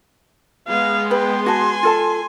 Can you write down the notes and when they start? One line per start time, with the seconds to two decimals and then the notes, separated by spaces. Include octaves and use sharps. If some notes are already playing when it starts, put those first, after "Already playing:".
0.68 G#3 B3 F5
1.11 B4 G5 C6
1.46 F#4 G#5 A5
1.83 F4 A4 A5